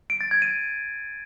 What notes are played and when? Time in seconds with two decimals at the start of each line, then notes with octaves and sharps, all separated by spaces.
0.10 D7
0.21 A6
0.31 G#6
0.42 D#7